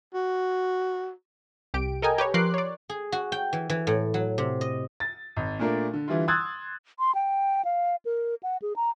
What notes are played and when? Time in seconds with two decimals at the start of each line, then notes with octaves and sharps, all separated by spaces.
0.14 F#4
1.74 C2 G4 D7
2.02 A4 A#4 D#5 G5 G#5 A#5
2.18 G4 B4 C#5
2.34 F3 A#4 C6 D6 F#6 C7
2.54 C#5 D5
2.89 G#4
3.12 F#4
3.32 G5
3.53 E3
3.70 E3
3.87 A2
4.14 F#3
4.38 C3
4.61 D#5
5.00 A6
5.36 G#1
5.59 A#2 A3 D4 A#4
5.94 D3
6.08 D3 E3 G3 E4 F4
6.28 C6 D#6 E6 F#6 G#6 A6
6.99 C6
7.15 G5
7.65 F5
8.05 A#4
8.43 F#5
8.62 G#4
8.76 A#5